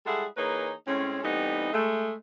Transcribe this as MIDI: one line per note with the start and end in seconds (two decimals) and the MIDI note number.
0.06 0.26 55
0.06 0.26 56
0.06 0.26 64
0.06 0.26 68
0.06 0.26 69
0.06 0.26 78
0.37 0.72 52
0.37 0.72 58
0.37 0.72 63
0.37 0.72 68
0.37 0.72 71
0.37 0.72 73
0.87 1.19 45
0.87 1.19 56
0.87 1.19 60
0.87 1.19 61
1.23 1.68 52
1.23 1.68 55
1.23 1.68 57
1.23 1.68 59
1.23 1.68 60
1.23 1.68 63
1.73 2.13 56
1.73 2.13 57